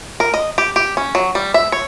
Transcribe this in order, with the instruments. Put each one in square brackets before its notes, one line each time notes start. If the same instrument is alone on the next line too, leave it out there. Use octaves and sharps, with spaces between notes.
[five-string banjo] A#4
D#5
G4
G4
C#4
F#3
G3
E5
C#5